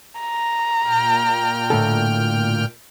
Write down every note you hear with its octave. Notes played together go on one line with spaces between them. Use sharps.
A#5
A#2 G5 F6
A2 D3 A4